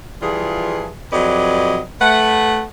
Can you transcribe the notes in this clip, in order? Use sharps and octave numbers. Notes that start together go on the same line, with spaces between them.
E3 F3 G3 F4 G#4
F2 F#3 G4 B4 D5 D#5
A3 B4 F#5